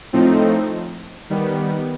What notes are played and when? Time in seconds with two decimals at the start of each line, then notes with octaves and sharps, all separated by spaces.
0.13 A2 F3 A3 C4 D#4
1.30 D#3 G3 B3